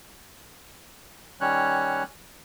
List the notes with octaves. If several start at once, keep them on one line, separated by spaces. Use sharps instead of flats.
D#3 G3 C#4 C#5 F#6